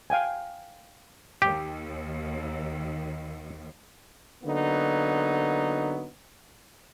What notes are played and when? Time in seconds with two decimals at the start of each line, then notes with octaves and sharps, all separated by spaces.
0.10 F5 G5 G#5
1.42 D#2 G4
4.43 D3 F#3 A#3 B3 D#4